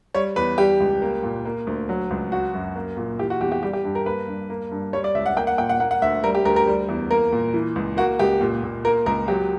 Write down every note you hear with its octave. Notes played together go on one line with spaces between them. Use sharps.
G3 C#5
E2 B4
G3 G4
C#2
A#3
A#2
A#3
D2
F#3
C#2
F#3 F#4
F#2
A#3
A#2
E3 G4
F#4
E2 G4
G4
G3 G4
G4
G2
A#4
A#3 B4
G2
A#3
G2
G3 C#5
D5
C#2 E5
F#5
A#3 G5
F#5
A#2 G5
F#5
A#3 F#5
F#5
D2 E5
G3 A#4
G4
D2 A#4
A#4
G3
E2
A#3 A#4
A#2
E3
C#2
A#3 F#4
C#2 G4
A#2
A#2
A#3 A#4
C#2 A#4
F#3 G4